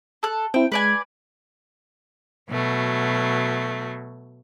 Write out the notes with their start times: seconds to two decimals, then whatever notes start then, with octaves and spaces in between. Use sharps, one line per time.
0.23 A4 F#6
0.54 C4 E4 G5
0.72 G#3 B4 D5 G#5
2.48 B2 F#3 A3